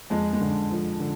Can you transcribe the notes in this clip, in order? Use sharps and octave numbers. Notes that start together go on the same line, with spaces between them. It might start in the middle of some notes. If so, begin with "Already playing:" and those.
F2 G#3
G#3
D3
F3
D3